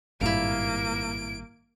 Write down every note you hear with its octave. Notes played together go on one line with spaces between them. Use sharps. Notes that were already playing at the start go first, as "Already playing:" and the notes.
G#1 G2 A#2 A#3 E4 F5 D7